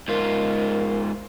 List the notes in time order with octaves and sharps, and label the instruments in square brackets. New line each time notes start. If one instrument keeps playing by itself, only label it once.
[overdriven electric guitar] G#2 F4 [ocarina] A#4